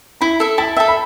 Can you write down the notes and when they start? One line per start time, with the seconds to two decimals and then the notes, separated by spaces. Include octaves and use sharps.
0.21 E4 B5
0.40 A4 E5
0.58 E4 A5
0.76 A4 E5 G5
0.88 B5